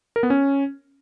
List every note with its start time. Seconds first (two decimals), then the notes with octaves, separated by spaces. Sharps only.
0.16 A#4
0.23 B3
0.30 C#4